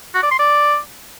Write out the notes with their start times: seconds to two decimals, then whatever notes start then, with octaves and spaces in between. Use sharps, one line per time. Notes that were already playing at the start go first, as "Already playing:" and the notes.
0.15 F#4
0.23 D5
0.31 C6
0.39 D5